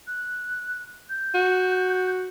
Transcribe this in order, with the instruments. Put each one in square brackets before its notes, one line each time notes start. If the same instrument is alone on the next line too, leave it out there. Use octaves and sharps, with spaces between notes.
[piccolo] F#6
G6
[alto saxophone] F#4